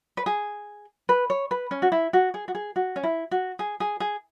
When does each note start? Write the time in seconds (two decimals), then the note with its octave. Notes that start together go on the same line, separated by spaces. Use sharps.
0.17 B4
0.26 G#4
1.09 B4
1.30 C#5
1.51 B4
1.71 C#4
1.82 F#4
1.92 E4
2.13 F#4
2.34 G#4
2.48 F#4
2.55 G#4
2.76 F#4
2.96 C#4
3.03 E4
3.31 F#4
3.59 G#4
3.80 G#4
4.00 G#4